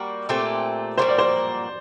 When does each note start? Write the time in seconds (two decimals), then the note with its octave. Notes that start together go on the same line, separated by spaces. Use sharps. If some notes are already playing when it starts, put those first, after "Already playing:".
Already playing: G3 A#3 F#4
0.29 A#2 A3 C4 G4
0.98 A#2 G3 A#3 F#4 C5
1.08 D5
1.18 C5